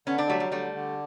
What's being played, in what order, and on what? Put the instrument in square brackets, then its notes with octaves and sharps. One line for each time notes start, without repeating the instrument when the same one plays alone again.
[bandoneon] D3 [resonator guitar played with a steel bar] B3 C#4
[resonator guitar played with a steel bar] C4 D4
[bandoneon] F#3 [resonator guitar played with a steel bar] G3 A3
[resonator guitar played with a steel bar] G3
[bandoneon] D3 [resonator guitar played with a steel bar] G3 A3
[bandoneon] D3